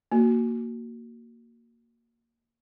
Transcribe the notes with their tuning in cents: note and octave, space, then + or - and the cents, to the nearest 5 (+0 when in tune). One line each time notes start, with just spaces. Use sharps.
A#3 -5 F#4 +0